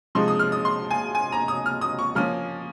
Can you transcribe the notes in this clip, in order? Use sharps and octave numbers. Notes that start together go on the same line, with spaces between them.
C3 F3 G#3 D#4 C6
D#6
F6
D#6
C6
G#5
G#5
A#5
D#6
F6
D#6
C#6
F3 A#3 C#4 F6